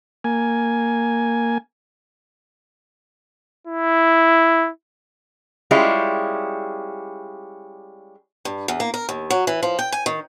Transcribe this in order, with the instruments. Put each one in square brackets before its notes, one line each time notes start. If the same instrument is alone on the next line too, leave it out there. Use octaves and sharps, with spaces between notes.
[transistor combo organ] A#3 G#5
[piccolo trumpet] E4
[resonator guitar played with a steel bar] G3 G#3 C#4 E4 F4 G4
[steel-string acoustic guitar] G2
E2
A#3
A#4
D#2
F#3
E3
F3
G5
G#5
D#3